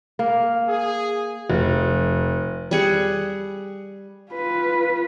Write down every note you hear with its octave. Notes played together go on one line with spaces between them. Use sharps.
A#3
G#4
F1
G3 G#4 F#5
F4 B4